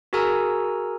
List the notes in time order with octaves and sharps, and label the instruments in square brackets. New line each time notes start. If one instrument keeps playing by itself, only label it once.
[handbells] F#4 G#4 A#4 G#5 A#5 E6